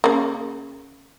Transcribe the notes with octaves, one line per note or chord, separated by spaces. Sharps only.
C#3 A#3